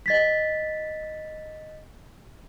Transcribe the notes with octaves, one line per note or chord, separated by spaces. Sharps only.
D#5 A6 B6